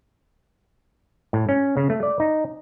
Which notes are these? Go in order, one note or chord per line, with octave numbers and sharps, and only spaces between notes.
A2
C#4
C#3
A3
D5
D#4